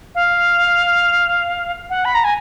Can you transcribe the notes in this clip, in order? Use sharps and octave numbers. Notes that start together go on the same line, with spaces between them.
F5
F#5
B5
A#5
G#5